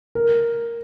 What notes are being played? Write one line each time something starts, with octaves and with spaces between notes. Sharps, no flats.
A#4